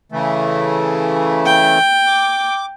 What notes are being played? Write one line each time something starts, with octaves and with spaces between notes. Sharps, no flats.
C#3 E3 A3
G5
D6